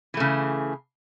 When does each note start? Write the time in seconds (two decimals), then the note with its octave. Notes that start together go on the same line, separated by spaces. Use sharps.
0.14 E3
0.17 A3
0.20 C#3